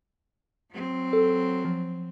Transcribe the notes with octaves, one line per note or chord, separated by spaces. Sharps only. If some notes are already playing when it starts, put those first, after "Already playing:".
F#3 C4
A4
F3